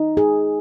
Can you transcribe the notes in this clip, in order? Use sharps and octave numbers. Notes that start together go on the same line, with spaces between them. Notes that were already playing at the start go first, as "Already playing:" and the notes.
Already playing: D#4
G#4